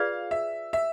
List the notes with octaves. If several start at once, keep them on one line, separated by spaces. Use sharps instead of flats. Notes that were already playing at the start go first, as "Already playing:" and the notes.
Already playing: F4 G#4 B4 D5 F5
E5
E5